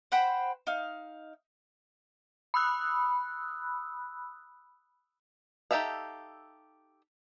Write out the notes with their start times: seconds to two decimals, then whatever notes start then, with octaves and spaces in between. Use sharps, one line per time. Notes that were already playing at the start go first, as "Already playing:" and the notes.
0.12 C5 F#5 G5 B5
0.67 D#4 F5
2.54 B5 D#6 E6 F#6
5.71 D#4 G4 A4 E5 F5